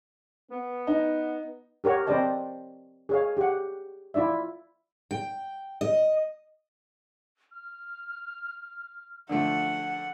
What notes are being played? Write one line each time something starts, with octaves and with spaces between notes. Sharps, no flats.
B3
D#4
G4 A#4 C#5 F#5
C4 B4 C5 D5 D#5 A5
G#4 C#5 F5
G4 F#5
E4 F4 D5 E5
G5
D#5
F6
D3 F3 A3 F#5